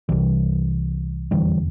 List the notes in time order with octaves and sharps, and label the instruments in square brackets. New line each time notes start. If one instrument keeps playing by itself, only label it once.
[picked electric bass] C2 C3 E3 G3
F1 E2 D3 E3 G3